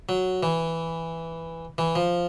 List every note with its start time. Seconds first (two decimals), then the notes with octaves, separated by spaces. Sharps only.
0.09 F#3
0.43 E3
1.78 E3
1.96 F3